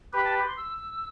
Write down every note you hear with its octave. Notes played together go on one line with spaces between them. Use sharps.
G4 B4 B5
A5
B5
C6
E6